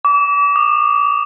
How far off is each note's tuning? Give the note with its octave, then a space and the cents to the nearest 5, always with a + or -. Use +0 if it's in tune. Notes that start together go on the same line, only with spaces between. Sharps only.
D6 -35
D6 +45